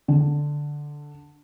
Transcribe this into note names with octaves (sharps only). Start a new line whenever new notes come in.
D3